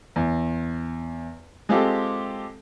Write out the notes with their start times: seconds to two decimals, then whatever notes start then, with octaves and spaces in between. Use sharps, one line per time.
0.16 E2
1.69 G#3 C4 F4 G4 A4